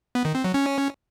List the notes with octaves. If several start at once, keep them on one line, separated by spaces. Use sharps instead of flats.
B3
D#3
C4
F#3
C#4